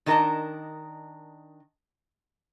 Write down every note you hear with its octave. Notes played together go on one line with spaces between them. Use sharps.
D#3 D4 A#4 B4 D#5 A5